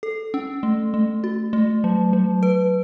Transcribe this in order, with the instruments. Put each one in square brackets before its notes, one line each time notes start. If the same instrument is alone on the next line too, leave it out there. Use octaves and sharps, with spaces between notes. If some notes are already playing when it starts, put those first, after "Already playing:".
[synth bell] A4
C#4
A3
A3
F#4
A3
F#3
F#3
B4